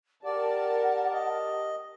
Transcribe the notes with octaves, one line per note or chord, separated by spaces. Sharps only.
G4 A#4 D5 F#5 A5
D#5